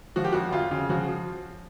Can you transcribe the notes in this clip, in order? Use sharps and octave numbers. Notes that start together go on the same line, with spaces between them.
F3 F#4
G4
F2 F#4
F2 F4
C#3
F3 F#4